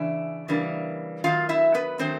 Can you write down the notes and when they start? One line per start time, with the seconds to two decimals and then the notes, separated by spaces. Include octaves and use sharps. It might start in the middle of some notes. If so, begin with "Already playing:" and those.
Already playing: C#3 E3 D4 E5
0.48 C#3 E3 G3 A#3 D4
1.24 D#3 F#3 A3 F4 F5
1.49 E4 E5
1.74 B3 B4
1.99 D#3 F#3 A3 C4 C5